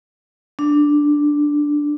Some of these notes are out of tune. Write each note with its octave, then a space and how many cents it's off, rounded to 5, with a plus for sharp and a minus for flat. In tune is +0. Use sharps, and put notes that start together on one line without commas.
D4 +0